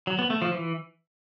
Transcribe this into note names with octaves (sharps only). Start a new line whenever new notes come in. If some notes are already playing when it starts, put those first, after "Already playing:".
F#3
B3
A3
F3
E3